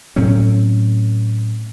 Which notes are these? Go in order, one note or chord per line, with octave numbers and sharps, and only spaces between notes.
A2 F#3 C4 C#4